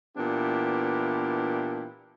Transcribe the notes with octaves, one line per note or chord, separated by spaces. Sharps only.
A#2 E3 B3 D4 E4 G4